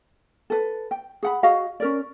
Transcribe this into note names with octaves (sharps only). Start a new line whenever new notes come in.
A4 B4
G5
G#4 F#5 B5
F#4 G#4 D#5 F5
C#4 A#4 D5